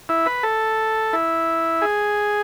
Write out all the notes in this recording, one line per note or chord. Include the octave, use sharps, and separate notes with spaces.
E4
B4
A4
E4
G#4